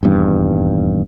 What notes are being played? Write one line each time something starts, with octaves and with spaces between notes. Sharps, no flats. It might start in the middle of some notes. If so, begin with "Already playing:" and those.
D#1 E2 G2